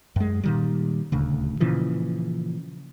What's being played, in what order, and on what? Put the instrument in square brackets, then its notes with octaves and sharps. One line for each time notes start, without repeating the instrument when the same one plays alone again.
[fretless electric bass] F#2 G#3
A#2 D#3 G3
D#1 D2 C#3
A#2 C#3 E3 F3